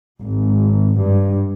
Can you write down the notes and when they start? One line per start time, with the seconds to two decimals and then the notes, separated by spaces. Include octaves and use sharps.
0.20 G#1
0.96 G2